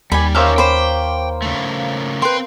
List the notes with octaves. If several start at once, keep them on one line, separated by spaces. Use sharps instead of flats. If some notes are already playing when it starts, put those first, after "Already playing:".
D#2 G3 G#5 B5
A#3 C#4 D#4 G4 C5 E5 F5
C5 G5 B5 D6
C#3 A3
C4 B4 G5 C6